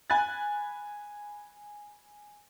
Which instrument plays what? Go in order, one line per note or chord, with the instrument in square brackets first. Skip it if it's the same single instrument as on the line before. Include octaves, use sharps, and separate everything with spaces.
[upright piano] G#5 B5 F#6 A6